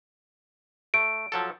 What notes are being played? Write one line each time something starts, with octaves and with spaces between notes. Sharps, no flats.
A3 D7
F3 F#3 A4